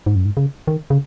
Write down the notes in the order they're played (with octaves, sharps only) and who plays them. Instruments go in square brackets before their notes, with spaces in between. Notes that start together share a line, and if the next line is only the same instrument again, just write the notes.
[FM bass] G#2
F#2
G#2
C#3
D#3
C#3